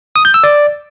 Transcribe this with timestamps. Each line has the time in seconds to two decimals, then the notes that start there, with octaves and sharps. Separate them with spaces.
0.16 D#6
0.25 G6
0.34 E6
0.44 D5